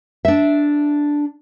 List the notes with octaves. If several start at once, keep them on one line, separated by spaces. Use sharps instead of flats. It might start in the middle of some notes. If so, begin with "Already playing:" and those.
D4 E5